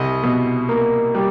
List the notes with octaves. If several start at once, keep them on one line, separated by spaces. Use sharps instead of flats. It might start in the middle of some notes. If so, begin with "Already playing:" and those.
Already playing: C2 D#5
B2
A#3
G3